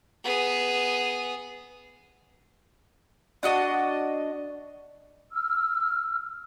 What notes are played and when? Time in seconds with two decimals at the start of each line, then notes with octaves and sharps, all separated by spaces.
0.25 B3 G#4
3.43 D4 F#4 D#5 A5
5.32 E6 F6